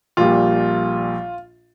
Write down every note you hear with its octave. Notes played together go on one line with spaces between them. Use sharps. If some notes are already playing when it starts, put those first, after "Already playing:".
A#1 A#2 G3 F4